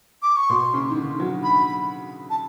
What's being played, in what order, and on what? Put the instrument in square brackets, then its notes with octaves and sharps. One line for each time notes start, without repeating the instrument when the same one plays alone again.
[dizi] D6
C#6
[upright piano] B2 [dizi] C6
[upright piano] C#3
D#3
D3
F#3
[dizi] B5
A5